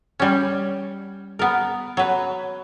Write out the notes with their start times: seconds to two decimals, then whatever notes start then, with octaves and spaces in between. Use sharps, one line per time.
0.20 G3 C#4
1.39 B3 A#4
1.97 F#3 B4